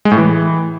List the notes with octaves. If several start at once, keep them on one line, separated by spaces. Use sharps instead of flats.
G#3
A2
E3